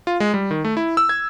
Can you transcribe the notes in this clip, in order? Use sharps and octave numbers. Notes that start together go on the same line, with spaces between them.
F4
G#3
G3
D#3
A3
E4
E6
G#6